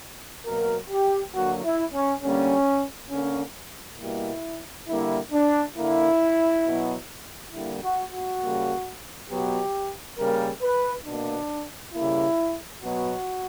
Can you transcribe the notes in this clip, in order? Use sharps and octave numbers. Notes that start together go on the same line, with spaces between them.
B2 F#3 A#3 A#4
G4
D3 F#3 A#3 F#4
E4
C#4
D3 G3 A#3 C#4
D3 A#3 C#4
B2 G3 A#3 E4
D3 G3 A#3 E4
D4
D3 A#3 E4
B2 F#3 B3
D3 G3 A#3 E4
F#4
F#4
C#3 G3 A#3
B2 F#3 B3 G4
C#3 G3 A#3 A#4
B4
B2 A#3 D4
C#3 G3 A#3 E4
B2 F#3 B3 F#4